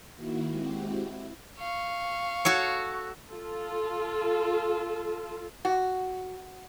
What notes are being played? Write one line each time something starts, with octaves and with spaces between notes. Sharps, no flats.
D#3 A#3 E4 F#4
G#3 C4 E4 F#4 G4
E4
F5 C#6
F#4 A4 C#5
F4 A4
F#4